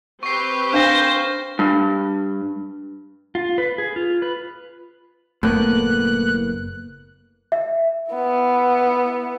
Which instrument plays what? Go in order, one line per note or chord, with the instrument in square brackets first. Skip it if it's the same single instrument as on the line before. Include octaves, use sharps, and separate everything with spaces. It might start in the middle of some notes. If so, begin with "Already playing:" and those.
[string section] C4 G4 B4 [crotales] C#6 C7
[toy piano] D4 F5 G5 [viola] C5 [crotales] F6 G6 A#6
[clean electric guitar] G2
[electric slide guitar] F4
B4
G#4
F4
B4
[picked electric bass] F#1 A#3 B3 [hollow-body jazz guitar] A2 [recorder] F#6
[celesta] E5
[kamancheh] B3 E4